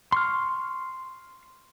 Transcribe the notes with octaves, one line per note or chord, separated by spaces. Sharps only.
C6 C#6 F6